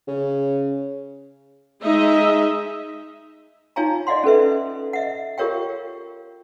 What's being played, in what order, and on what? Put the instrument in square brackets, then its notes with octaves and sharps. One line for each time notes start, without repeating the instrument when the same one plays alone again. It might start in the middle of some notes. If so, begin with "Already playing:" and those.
[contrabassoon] C#3
[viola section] G#3 D#4 D#5 E5
[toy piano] D#4 F4 C#5 F5 G#5 A#5
D5 D#5 F5 F#5 C6
C#4 A4 B4 E5
D#5 E5 F#5
F4 G4 A#4 C#5 F5 G5